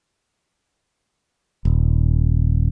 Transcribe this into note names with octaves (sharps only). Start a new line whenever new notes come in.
D#1